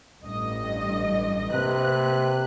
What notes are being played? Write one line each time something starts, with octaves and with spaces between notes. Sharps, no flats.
A1 G2 D#5
C3 A#3 B4 F#6